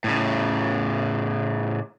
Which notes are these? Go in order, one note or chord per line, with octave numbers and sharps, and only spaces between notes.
A2 C#3